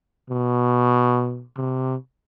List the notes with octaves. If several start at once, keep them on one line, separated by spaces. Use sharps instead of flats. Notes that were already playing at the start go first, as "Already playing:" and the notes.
B2
C3